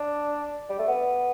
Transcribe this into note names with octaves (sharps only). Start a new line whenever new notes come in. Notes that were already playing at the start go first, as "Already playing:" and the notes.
Already playing: D4
G3
A3
B3